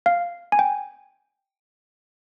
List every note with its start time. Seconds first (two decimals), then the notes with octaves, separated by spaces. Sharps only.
0.06 F5
0.52 G#5
0.59 G5